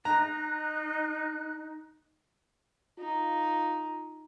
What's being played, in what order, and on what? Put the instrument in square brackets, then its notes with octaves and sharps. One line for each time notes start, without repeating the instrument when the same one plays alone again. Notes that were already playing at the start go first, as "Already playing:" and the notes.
[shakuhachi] D#4 [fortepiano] A#5 [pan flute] F#6
[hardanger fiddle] D#4 [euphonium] F4